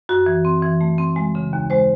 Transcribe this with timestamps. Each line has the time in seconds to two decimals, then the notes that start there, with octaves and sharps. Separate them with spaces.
0.09 F#2 F#4
0.26 E3
0.45 C4
0.62 E3
0.81 A3
0.98 C4
1.16 G#3
1.35 C#3
1.53 D#2
1.70 G#3 C5